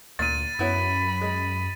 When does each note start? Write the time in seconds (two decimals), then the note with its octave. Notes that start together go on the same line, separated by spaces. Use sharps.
0.19 D2 A#2 A6 D#7
0.59 F#2 F#3 B3 E4 B5
1.21 G#3